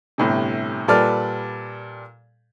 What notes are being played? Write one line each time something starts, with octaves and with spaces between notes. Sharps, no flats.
G1 A2 C3
A#2 G3 A4 B4 D5 F6